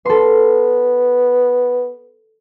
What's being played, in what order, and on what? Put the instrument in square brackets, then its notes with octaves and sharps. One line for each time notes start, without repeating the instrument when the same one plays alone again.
[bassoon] B3 [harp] A4 C6